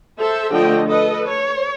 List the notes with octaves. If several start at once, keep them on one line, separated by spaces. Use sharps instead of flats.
A4 C5 E5
D3 F3 A3 D#5 G5
A4 B4 D#5
C#5